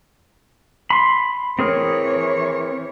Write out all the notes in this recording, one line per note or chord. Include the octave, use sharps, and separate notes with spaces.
B5 C6
E3 C4 G#4 A#4 C#5